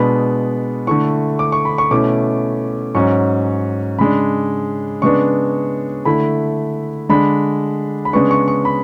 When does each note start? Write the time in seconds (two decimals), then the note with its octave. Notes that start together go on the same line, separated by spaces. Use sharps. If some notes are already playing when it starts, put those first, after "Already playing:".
Already playing: B2 G#3 B3 D4 B5
0.87 D3 A3 E4 C#6
1.39 D6
1.52 C#6
1.65 B5
1.78 C#6
1.91 B2 A3 C#4 E4 D6
2.95 G#2 F#3 C#4 C#6
3.99 C#3 G#3 D4 B5
5.02 C#3 G#3 B3 D4 C#6
6.05 D3 A3 E4 B5
7.09 D3 G#3 D4 B5
8.05 B5
8.13 C#3 G#3 B3 D4 C#6
8.31 C#6
8.48 C#6
8.65 B5